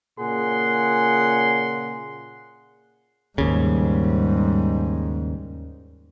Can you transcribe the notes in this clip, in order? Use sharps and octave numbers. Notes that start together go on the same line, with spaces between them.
A#2 C#3 G#4 F#5 C6
D#2 G#2 C#3 G3